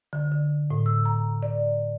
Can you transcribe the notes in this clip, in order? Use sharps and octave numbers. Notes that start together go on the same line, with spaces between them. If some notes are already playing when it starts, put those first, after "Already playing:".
D3
D3
A2
E6
A#5
D5